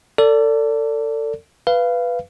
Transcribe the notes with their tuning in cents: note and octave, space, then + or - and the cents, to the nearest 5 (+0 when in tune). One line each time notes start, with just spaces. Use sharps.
A4 +35 D5 -20
B4 +0 F5 -20